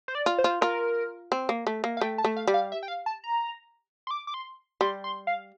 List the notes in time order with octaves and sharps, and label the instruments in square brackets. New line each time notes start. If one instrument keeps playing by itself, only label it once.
[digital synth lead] C5
D5
[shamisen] F4
[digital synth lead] C5
[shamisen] F4
[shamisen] F4 [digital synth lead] A#4
[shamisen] C4
A#3
A3
A#3
[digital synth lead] F5
[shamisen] A3 [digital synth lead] G5
[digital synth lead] A5
[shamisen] A3
[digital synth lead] F5
[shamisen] G3
[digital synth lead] F5
E5
G5
F5
A5
A#5
C6
D6
D6
C6
[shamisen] G3 [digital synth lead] C6
[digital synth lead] C6
F5